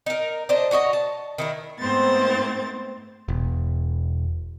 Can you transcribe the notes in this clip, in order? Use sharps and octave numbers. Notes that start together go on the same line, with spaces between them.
D#4 A#4
D4 C5 D#5
D4 F#4 C#5 D#5
A5
D#3 E4 A#4
G#2 A3 B3 C4 C5 A6
E1